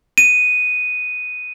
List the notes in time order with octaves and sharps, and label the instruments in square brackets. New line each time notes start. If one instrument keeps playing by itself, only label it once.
[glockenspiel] D#7